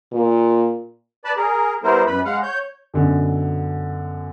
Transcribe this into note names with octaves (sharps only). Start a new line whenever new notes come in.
A#2
B4 D5 A5 B5
G#4 A#4
G3 B3 E4 A#4 C5
F#2 B4 B5
G#3 F5 F#5
C#5 G6
F#2 B2 D3